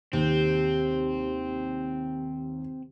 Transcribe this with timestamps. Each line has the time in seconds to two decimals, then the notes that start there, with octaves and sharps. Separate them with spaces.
0.13 D#2 C3 C4